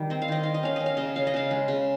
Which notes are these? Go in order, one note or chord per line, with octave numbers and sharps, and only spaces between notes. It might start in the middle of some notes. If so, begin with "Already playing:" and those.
Already playing: D#3 G3
C4 D#5
F5
D#3 D#5
D#3 F5
D#5
C#4 F5
C#4 D#5
F5
C#3 D#5
C#3 F5
D#5
C#3 F5
G#3
C#3